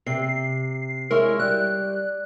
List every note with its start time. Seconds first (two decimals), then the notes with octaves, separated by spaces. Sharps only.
0.06 C3 C7
1.11 G#3 E4 A#4 C#5
1.39 G3 F#6